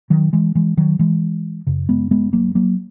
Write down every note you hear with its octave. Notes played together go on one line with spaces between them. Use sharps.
D#3 F#3
E3 G#3
E3 G#3
D#3 F#3
E3 G#3
F#2 C#3
G#3 B3
G#3 B3
F#3 A#3
F#3 A#3